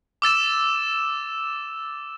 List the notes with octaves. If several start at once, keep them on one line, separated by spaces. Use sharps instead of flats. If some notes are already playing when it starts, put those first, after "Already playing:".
D6 E6 A6 E7